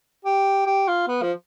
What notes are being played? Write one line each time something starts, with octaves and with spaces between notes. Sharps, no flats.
G4
G4
F4
B3
F3